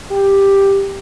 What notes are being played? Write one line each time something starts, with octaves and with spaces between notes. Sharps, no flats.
G4